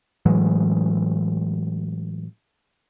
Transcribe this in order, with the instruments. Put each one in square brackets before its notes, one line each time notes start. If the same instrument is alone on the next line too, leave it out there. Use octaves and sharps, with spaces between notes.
[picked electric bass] A2 E3 F#3 G#3